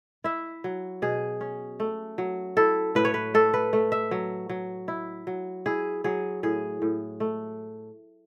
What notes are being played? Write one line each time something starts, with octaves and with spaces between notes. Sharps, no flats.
E4 E5
F#3
B2 G#4
C#4
A3
F#3
E4 A4
A2 B4
C#5
B4
A3 A4
B4
A3
E5
F#3
F#3
E4
F#3
E4 G#4
F#3 G#4
A2 G#4
A2
A3